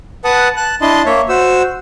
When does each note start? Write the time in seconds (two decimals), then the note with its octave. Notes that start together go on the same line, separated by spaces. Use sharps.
0.25 B4 F#5 A5 D#6
0.57 A5 F#6
0.81 D4 E4 D#5 A5 C6
1.06 A#3 C#5 E5
1.29 F#4 C5 E6